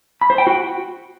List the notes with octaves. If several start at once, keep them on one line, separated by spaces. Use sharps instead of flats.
B5
C5
G5
F#4